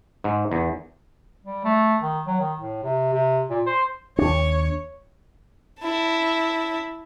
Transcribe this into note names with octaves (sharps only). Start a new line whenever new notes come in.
G#2
E2
G3
A3
D#3
F#3
D#3
A2
C3
C3
A#2
C5
D#2 D4 C#5
E4 A5